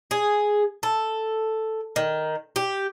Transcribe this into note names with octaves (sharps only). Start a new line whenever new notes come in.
G#4
A4
D#3
G4